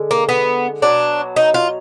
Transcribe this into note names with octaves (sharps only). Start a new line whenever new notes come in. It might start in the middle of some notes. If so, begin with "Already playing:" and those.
Already playing: D3 G#3
A#3
B3
B2 F#3 D4
D#4
F4